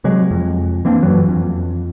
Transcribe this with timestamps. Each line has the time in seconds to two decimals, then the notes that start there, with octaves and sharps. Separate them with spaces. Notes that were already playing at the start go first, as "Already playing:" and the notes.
0.04 C3 F#3 G#3
0.31 F2
0.85 E3 A#3 C4 D4
1.03 F#2 E3 F#3
1.29 F2